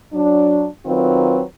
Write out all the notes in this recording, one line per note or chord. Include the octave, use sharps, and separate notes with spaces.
F#3 D4
D#3 F#3 C4 F4 B4